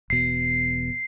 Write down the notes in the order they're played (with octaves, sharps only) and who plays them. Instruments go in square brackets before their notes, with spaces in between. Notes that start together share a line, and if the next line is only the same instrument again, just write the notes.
[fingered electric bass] E1 B2 [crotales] C7